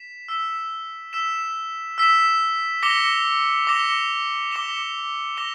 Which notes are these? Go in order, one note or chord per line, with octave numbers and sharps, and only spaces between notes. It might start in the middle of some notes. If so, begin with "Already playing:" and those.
Already playing: B6 E7
E6 B6 E7
E6 B6 E7
E6 B6 E7
D6 A#6 C#7 E7 G7
D6 A#6 C#7 E7 G7
D6 A#6 C#7 E7 G7
D6 A#6 C#7 E7 G7